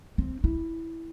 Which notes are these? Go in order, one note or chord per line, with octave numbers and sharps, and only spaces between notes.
C4
E4